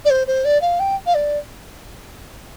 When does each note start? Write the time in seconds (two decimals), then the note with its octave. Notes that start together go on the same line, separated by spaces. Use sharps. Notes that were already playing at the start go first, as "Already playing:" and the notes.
0.05 D5
0.10 C5
0.27 C5
0.45 D5
0.62 F5
0.80 G5
1.06 F5
1.15 D5